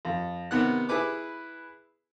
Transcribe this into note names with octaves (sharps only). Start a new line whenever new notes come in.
F2
C3 D#3 B3 F#5 F#6
E4 G#4 B4 D6